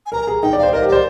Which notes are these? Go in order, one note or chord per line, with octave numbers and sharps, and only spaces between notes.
G#5
A#4 A#5
G#4
D#4 G5
D5
C5 F5
A#4 D#5
G4
C5 D5